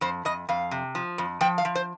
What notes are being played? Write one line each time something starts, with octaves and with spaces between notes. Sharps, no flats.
F2 C5
F2 D#5
F2 F5
C3
F3
F2
F3 G5
F5
F3
C5